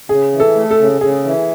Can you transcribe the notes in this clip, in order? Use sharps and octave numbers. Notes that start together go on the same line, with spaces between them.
C#3 G#4
E3
A4
A3
A4
C#3
C#3 G#4
E3